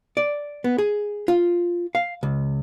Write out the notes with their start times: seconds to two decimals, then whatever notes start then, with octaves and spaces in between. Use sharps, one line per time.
0.17 D5
0.64 B3
0.78 G#4
1.28 F4
1.95 F5
2.23 C#2